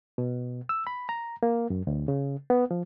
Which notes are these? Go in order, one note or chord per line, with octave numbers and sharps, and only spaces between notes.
B2
E6
B5
A#5
A#3
F#2
D2
C#3
B3
F3